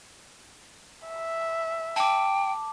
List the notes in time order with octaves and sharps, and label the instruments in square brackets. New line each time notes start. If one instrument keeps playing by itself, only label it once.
[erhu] E5
[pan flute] G5 [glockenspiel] A5 D6